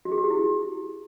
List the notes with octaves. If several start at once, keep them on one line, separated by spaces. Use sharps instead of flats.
F#4
G#4
F#4
G4
E4